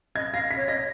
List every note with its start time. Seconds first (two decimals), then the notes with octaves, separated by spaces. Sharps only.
0.16 D#5 G#6
0.33 F5 A#6
0.51 B6
0.57 C#5
0.68 D#5 A#6